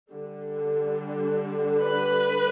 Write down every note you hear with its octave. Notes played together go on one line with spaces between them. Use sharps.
D3 G3 D4
B4